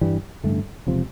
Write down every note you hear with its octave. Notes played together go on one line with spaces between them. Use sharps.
G2 E3 G3
A1 G2 D3 A3
E1 C3 F3